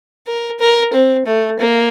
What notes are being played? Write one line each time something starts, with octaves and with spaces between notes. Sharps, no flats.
A#4
A#4
C4
A3
A#3